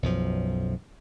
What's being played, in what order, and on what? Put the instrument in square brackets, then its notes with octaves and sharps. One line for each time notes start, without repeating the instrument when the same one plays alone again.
[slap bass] B1 F#2 F3